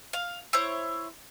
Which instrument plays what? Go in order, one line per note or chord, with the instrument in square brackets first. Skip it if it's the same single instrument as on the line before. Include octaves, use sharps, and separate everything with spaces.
[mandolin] F5
E4 C5 C#5